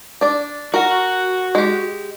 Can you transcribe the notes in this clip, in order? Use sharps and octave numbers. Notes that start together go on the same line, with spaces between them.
D4 D5
F#4 A#4 F#5
G#3 G4